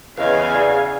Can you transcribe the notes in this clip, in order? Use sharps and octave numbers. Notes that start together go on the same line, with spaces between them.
E2 C#3 B4 D#5 F5 G#5
G#4 D5